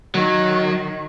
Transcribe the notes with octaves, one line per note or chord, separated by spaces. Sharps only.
D#3 F#3